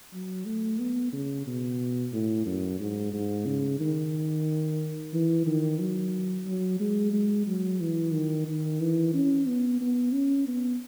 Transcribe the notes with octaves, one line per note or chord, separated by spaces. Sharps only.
F#3
A3
B3
C#3
B2
A2
F#2
G#2
G#2
C#3
D#3
E3
D#3
F#3
F#3
G#3
G#3
F#3
E3
D#3
D#3
E3
C#4
B3
B3
C#4
B3